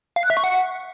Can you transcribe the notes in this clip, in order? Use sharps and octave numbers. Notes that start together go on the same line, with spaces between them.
F5
F#6
E5
C#6
F#5